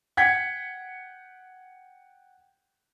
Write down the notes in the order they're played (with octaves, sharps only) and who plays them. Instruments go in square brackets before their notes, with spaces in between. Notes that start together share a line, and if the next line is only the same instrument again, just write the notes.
[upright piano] F#5 G5 G#6 B6 C#7